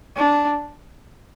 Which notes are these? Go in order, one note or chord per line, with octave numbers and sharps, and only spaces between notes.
D4